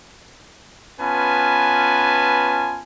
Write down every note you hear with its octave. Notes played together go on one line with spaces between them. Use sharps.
B3 C#4 F4 B4 G#5 A5